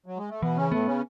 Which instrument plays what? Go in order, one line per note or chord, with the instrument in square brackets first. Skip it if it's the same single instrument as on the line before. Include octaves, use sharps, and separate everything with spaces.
[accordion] F#3
G#3
A3
[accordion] B2 B3 [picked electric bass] E3
[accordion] C#3 C#4
[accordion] A2 A3 [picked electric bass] B3
[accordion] C#3 C#4